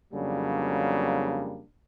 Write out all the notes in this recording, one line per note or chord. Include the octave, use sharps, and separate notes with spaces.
F2 C#3 F#3 G3 A#3 D4